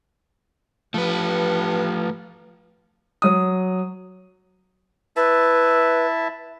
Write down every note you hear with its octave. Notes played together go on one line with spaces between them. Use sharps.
G2 F3 A3 B4
F#3 D#6
E4 B4 E5 A5